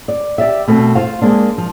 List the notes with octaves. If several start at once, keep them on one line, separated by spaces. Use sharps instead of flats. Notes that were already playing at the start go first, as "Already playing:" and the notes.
D5
G4 D5 E5
B2 A3 C4
F4 C5 F5
G#3 A#3 D4
F3